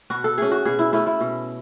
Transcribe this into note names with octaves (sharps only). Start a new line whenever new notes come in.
B2 F#4
A4
A3 C#4 G#4
F#4
B2 G#4
E4
A3 C#4 E4
E4
B2